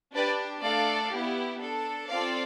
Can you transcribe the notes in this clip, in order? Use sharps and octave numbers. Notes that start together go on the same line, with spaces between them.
D4 G4 B4 D5
A3 D4 A4 D5 F5
B3 E4 G4
D4 A4
C4 F4 A4 D5 F5